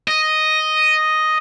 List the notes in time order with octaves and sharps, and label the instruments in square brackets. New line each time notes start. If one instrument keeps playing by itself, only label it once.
[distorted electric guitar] D#5